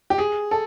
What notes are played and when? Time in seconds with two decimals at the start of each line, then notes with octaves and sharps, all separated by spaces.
0.10 G4
0.18 G#4
0.51 A4